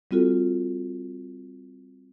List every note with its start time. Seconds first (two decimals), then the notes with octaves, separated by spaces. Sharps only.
0.11 G3 C4 F4 F#4 A4